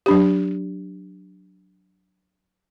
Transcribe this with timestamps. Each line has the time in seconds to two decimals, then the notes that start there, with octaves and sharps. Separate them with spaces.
0.06 F#3 D4 G4